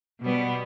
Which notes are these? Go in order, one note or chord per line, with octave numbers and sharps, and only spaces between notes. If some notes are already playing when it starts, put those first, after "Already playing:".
B2 G3 B3